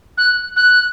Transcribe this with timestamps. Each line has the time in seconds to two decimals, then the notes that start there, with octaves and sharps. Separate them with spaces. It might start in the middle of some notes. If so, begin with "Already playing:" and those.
0.18 F#6
0.56 F#6